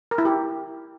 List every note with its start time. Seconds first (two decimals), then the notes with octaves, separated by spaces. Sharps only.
0.11 A#4
0.18 E4
0.25 G4